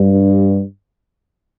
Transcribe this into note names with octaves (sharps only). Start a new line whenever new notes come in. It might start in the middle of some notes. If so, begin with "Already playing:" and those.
Already playing: G2